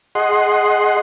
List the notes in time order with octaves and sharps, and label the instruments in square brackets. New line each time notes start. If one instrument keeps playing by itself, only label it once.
[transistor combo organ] G#4 D#5 F#5 C6